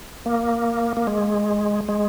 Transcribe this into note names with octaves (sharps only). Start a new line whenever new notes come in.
A#3
A#3
G#3
G#3